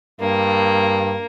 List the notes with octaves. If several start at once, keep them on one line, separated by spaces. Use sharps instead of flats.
G2 A#3